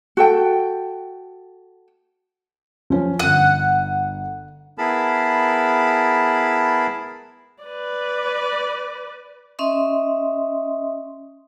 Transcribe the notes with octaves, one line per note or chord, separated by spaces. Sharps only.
F#4 A4 G5
F3 C#4
G1 F#5 D#7
B3 E4 G#4 A#4 A5 B5
B4 D5
C#4 D#5 E5 C6 D#6